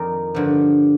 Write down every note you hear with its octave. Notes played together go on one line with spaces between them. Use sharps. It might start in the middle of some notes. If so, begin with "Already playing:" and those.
Already playing: F2 D#3 A#4 D5
G2 D3 F3